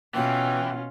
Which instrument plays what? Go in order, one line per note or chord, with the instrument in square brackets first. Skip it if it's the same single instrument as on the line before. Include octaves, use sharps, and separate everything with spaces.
[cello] B2 [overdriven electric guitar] E3 [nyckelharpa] C#4 F4 [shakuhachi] G5